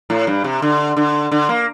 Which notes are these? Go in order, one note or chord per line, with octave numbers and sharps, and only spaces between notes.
A2
G2
C3
D3
D3
D3
A#3